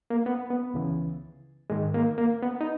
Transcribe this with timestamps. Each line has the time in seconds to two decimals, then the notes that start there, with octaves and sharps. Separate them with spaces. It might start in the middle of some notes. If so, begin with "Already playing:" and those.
0.10 A#3
0.26 B3
0.50 B3
0.74 C#2 C#3 E3
1.70 G#2 D#3 G#3
1.94 A#3
2.18 A#3
2.42 B3
2.61 D#4